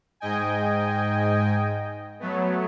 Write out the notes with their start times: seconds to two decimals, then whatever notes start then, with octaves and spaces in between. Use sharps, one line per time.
0.20 G#2 D#5 G5 G#5
2.20 F#3 A3 B3